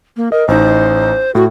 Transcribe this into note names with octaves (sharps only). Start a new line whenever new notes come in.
A#3
A#4 D#5
A1 D#4 C5
A2 F#4